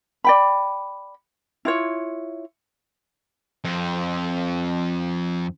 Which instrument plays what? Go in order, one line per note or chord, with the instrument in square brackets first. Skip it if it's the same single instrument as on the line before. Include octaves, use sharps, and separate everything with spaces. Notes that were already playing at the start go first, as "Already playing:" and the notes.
[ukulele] D5 G5 B5
E4 F4 C#5
[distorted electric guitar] F2 C4